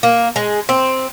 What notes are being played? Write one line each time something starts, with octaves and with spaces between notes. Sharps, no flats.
A#3
G#3
C4